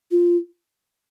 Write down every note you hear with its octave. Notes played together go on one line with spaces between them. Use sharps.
F4